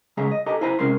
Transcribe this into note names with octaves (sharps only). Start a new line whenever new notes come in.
C#3 G#3 C#4 G#4 E5 A#5
D#5
D4 G4 A4 D#5 G#5 A#5
E4 C5 G#5 A#5 B5
C3 G#3 C#4 A#4 C6